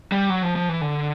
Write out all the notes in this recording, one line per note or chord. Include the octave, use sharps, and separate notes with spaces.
G3
F#3
F3
F3
E3
D3